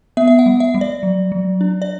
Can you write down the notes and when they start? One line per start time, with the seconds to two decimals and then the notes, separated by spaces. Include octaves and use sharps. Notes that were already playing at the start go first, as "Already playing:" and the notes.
0.17 B3 E5
0.28 E5
0.39 F#5
0.46 G3
0.60 E5
0.74 G3
0.81 D5
1.03 F#3
1.32 F#3
1.61 D4
1.82 D5